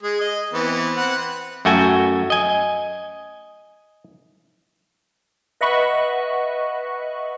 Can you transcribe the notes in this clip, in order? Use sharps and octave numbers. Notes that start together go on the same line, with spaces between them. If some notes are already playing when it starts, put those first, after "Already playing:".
G#3 G#4
D#5
E3 B3 C4
C4 B4 F#5
F#2 A3 F#4 G5 G#5
D#5 G#5
B4 D#5 E5 F#5 B5 C#6